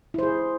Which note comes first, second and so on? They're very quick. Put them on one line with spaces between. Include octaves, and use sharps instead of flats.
E4 C5 G#4